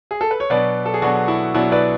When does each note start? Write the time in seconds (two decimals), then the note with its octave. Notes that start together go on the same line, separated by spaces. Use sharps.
0.11 G#4
0.21 A4
0.31 B4
0.40 C#5
0.50 B2 F#3 B3 D4 B4 D5
0.86 A4
0.94 G#4
1.02 B2 F#3 B3 D4 F#4
1.28 E4
1.54 B2 F#3 B3 D4 E4
1.72 B4 D5